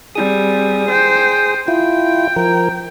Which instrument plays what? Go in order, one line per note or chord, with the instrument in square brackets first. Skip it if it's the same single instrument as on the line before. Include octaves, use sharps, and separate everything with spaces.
[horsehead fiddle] G3 C4 [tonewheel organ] G#4 D#6
[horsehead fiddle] C5 G5
[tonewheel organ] E4 F4 [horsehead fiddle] G5
[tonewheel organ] F3 A#4